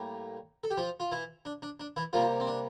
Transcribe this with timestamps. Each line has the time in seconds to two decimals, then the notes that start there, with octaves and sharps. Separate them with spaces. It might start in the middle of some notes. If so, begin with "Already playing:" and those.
Already playing: A2 G3 A#3
0.64 A4
0.71 G4
0.77 F3 F4
1.00 F4
1.12 E3 E4
1.45 D4
1.62 D4
1.80 D4
1.96 E3 E4
2.13 C3 F3 G3 A#3 F4
2.40 C4
2.47 D4